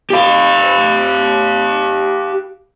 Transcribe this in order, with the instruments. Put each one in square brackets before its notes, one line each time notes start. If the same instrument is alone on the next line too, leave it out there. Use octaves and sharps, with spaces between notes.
[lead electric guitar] G4 F5